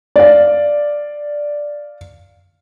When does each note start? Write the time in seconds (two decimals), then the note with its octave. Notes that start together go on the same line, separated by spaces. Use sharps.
0.16 D5 F5